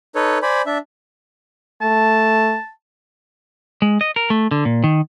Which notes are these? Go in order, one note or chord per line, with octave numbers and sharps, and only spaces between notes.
D#4 A4 B4 C#5
C5 D5 G#5 B5
D4 E5
A3 A5
G#3
D#5
A#4
A3
D3
A#2
D#3